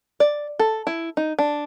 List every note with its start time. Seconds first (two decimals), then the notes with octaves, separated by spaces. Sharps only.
0.20 D5
0.59 A4
0.87 E4
1.17 D#4
1.39 D4